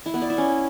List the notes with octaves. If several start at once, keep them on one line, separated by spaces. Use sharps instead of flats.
E4
B3
D5
E4
C#4